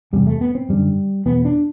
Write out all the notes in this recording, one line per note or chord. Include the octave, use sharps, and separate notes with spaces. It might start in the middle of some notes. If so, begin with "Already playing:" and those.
E2 C3 G3
A3
B3
C4
F#2 D3 G3
E2 B2 B3
D4